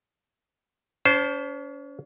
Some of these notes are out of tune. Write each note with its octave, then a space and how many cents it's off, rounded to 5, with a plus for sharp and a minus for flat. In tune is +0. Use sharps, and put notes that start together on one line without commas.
C#4 +40 C5 -10 A5 +0